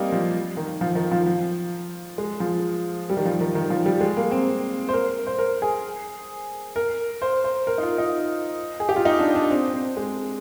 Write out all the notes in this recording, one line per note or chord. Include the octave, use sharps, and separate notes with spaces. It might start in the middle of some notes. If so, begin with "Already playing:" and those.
Already playing: G3 A#3 C4 D#4
F3
D#3
F3
D#3
F3
F3
G#3
F3
G3
D#3
F3
D#3
D#3
F3
G3
G#3
A#3
C4
C5
A#4
C5
A#4
G#4
A#4
C5
C5
A#4
D#4
F4
D#4
G#4
G4
F4
D#4
D4
D4
C4
C4
G#3